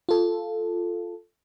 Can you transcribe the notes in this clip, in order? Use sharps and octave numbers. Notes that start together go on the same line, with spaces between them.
F4 A4